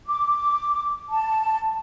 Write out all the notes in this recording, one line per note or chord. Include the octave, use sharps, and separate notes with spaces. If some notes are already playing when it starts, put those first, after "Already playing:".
D6
A5